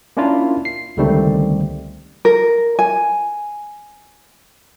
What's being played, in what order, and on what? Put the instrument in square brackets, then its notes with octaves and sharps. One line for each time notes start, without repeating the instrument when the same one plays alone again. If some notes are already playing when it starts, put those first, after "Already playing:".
[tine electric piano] A#3 C#4 D4 E4 F4 A#4
C7
C#2 D3 D#3 G3 A3 C4
[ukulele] A#4
G#5